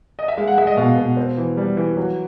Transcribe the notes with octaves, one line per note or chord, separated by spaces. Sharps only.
D#5
E5
G#3 F5
F#5
G#3 E5
D#5
B2 F5
B2
C4
E3
G3
E3
F#3